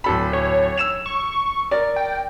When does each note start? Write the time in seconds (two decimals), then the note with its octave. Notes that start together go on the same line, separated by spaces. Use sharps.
0.04 D1 A4 B5
0.33 C#5
0.78 E6 E7 F7
1.06 C#6
1.71 A#4 D5
1.96 G5